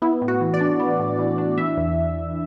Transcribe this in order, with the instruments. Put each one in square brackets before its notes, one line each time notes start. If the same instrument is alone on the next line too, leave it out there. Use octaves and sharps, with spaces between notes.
[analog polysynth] B3 E4
A2
F#4
E3
D5
D4
B3
A2
E3
D4
E3 E5
E2